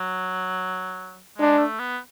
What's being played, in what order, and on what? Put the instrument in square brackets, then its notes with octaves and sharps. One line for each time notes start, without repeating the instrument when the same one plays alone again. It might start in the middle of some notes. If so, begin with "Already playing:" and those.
Already playing: [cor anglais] F#3
[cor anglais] G#3 [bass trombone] D4
[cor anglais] A3
B3